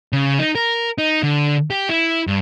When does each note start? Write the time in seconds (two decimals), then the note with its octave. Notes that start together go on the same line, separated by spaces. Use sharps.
0.13 C#3
0.39 D#4
0.55 A#4
0.98 D#4
1.23 D3
1.70 G4
1.89 E4
2.27 G2